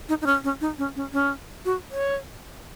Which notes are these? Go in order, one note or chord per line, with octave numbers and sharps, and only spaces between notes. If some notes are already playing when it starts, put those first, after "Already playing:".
D#4
D#4
C#4
C#4
D#4
C#4
C#4
C#4
F#4
C#5